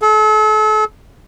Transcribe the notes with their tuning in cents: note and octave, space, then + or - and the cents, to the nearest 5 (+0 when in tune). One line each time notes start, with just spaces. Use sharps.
A4 -40